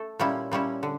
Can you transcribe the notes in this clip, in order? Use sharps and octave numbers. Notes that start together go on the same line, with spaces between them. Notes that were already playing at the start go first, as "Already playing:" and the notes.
Already playing: A3 A4
A#2 G3 C#4 E4
A#2 G3 C#4 E4
D3